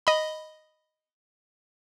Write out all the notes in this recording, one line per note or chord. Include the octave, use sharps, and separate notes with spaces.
D#5 B5